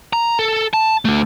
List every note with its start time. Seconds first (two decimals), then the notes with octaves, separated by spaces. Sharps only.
0.13 A#5
0.39 A4
0.73 A5
1.05 D3 A3